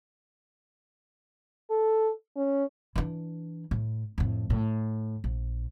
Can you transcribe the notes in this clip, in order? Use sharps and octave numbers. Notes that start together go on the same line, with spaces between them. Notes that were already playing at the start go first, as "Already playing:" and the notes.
A4
C#4
E3 D4
A2
F2 A2
A2
A#1